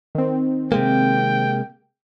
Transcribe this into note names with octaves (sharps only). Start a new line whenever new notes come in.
D#3 C4
C3 G#3 A#3 G5